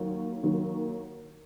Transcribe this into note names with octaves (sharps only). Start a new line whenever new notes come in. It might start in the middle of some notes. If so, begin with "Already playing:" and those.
Already playing: D#2 D#3 F#3
D#2 D#3 F#3